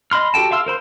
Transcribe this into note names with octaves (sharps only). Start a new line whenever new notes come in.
D#5 B5 C6 F6
F#4 G4 A4 G5 A5
E5 F5 C6 E6 F6
A#4 C5 B5 C6